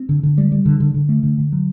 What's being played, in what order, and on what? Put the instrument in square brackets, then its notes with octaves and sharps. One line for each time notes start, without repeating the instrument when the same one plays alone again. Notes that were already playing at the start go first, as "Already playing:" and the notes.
Already playing: [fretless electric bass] C4
D3
D3
G3
G3
D3
D3
D3
A3
D3
D3
F#3